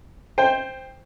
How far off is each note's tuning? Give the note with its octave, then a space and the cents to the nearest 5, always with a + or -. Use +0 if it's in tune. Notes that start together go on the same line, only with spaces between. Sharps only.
C5 +0 G5 +15